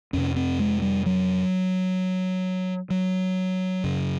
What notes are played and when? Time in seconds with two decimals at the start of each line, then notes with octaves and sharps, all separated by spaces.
0.13 F2 C3 C#4
0.36 C4
0.60 G#3
0.82 G3
1.06 F#3
2.90 F#3
3.84 F#2 C#3